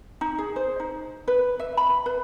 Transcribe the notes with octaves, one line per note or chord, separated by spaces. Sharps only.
D#4
G#4
C5
D#4
B4
E5
B5
B4